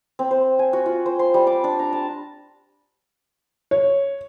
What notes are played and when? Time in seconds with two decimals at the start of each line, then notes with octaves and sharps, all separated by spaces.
0.19 C4
0.31 C5
0.59 G#5
0.73 F#4
0.86 F4
1.06 C5
1.19 C6
1.34 G3
1.47 D6
1.64 D4
1.79 A#5
1.93 A5
3.71 C#5